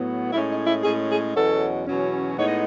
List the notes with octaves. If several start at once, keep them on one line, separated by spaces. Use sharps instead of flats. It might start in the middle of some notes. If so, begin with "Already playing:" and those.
Already playing: A2 F#3 B3
A2 G#3 C#4 E4
D#4
E4
A2 G#3 C#4 G#4
G#4
E2 B2 F#3 C#4 A4
E2 B2 F#3 C#4
A2 G#3 B3 D#4 C#5
D#5